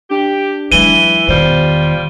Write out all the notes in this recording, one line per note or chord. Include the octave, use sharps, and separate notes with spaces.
D4 G4
E3 F#3 G#3 D#7 G7
E1 D#3 G3 F4 C5